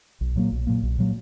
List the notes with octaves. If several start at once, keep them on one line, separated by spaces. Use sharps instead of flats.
B1
A#2 F#3 A#3
B1
A#2 F#3 A#3
B1
A#2 F#3 A#3